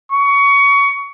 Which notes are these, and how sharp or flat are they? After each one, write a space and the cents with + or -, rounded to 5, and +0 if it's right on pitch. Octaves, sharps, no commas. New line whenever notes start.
C#6 +20